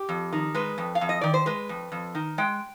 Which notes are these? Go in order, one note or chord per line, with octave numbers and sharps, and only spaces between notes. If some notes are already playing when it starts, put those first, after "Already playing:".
Already playing: G4
F2
D#3
G#3 B4
F2
F5
F2
D#5
D#3 D5
C5
G#3 B4
F2
F2
D#3
G#3 G5